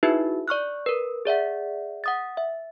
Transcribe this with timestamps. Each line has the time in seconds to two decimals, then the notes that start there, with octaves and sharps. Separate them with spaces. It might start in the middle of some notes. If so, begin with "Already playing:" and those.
0.03 D#4 E4 F#4 G#4 B4 E5
0.48 D5 C#6 F6 F#6
0.86 A#4 B4
1.25 G#4 D5 E5 F#5
2.04 F#5 D#6 A6
2.37 E5